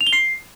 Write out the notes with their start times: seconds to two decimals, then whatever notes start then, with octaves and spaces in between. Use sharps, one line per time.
0.01 F7
0.07 G7
0.13 C7